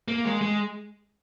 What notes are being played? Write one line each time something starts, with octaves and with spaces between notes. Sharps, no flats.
A#3
G#3
G#3